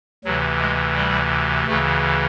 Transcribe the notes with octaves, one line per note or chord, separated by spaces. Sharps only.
D2 C3 E3 F#3
G#3
G3
D2 C#3 E3 A3